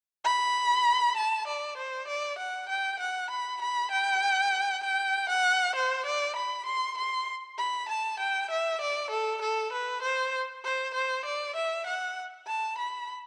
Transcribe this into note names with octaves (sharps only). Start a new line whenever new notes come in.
B5
A5
D5
C5
D5
F#5
G5
F#5
B5
B5
G5
G5
F#5
C5
D5
B5
C6
C6
B5
A5
G5
E5
D5
A4
A4
B4
C5
C5
C5
D5
E5
F#5
A5
B5